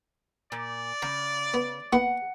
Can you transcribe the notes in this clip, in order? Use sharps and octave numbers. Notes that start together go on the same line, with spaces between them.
A#2 D5
C#3 A#5
B3
A#3 B3 E4 F#5